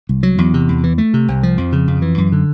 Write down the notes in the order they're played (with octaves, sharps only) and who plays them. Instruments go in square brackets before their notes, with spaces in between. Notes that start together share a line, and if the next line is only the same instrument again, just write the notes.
[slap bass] C2
F#3
E2
C3
E2
E3
A3
C3
C2
F3
F2
C#3
F2
E3
F#2
D3